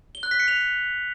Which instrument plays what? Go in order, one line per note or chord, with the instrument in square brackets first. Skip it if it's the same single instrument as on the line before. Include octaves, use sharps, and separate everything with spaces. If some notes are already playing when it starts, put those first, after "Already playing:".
[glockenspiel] G7
F#6
B6
C#7
F7